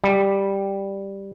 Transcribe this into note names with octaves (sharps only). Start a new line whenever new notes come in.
G3